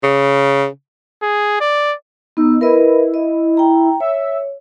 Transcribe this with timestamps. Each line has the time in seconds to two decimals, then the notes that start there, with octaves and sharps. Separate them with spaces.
0.03 C#3
1.22 G#4
1.61 D5
2.37 B3 D#4 E6
2.61 E4 A#4 B4 D#5
3.14 D#5
3.57 G5 A#5
4.00 C#5 E5